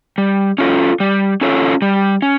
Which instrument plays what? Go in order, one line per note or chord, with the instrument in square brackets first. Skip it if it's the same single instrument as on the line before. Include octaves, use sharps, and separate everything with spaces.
[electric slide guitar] G3
C#4 F4 A4 C#5
G3
C#4 F4 A4 C#5
G3
C#4